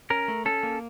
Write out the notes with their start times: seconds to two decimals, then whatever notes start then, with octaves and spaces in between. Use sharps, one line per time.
0.10 C#4 A#4
0.28 A3
0.45 C#4 A4
0.63 A#3